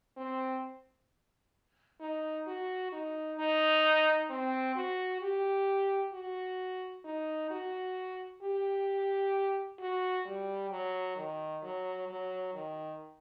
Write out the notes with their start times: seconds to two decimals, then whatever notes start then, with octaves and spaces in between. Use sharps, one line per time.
0.17 C4
2.01 D#4
2.47 F#4
2.92 D#4
3.39 D#4
4.30 C4
4.76 F#4
5.21 G4
6.13 F#4
7.05 D#4
7.51 F#4
8.42 G4
9.79 F#4
10.26 G3
10.71 F#3
11.16 D#3
11.63 F#3
12.08 F#3
12.54 D#3